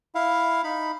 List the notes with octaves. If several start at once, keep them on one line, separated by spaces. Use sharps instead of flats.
E4 F5
D#4 B5